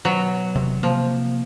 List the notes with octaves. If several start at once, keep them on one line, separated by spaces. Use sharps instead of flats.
B2 F#3
E1 C3
C3 F3 A#3